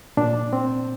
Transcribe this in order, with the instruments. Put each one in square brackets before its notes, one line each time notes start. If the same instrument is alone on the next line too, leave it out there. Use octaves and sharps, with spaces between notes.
[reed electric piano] A#2 D4
C4